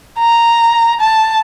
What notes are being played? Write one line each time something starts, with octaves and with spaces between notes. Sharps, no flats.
A#5
A5